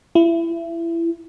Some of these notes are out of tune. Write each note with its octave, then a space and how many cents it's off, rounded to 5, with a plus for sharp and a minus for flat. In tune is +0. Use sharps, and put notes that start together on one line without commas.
E4 +25